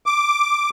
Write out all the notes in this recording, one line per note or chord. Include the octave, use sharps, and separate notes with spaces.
D6